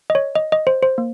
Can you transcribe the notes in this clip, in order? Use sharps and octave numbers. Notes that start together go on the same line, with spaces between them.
D#5
C#5
D#5
D#5
C5
C5
A#3